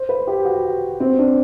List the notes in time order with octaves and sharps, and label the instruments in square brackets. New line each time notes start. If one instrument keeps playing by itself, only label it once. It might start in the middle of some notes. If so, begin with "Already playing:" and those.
Already playing: [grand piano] C5
B4
G4
F#4
C4
D4